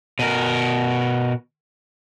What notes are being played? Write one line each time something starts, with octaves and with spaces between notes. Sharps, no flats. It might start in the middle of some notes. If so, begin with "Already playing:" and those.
B2 A#4